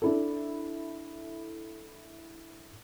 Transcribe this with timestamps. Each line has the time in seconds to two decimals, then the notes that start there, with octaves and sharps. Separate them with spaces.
0.02 D4 E4 A4